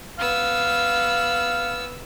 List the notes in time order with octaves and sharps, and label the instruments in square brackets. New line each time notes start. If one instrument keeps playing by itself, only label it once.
[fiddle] B3 E6 [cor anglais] F5